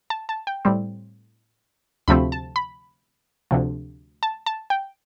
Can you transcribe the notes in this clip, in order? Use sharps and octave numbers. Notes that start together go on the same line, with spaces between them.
A5
A5
G5
A2 G3 C4
D2 C3 F3 A3 C4 B5
A5
B5
D2 C3 F3
A5
A5
G5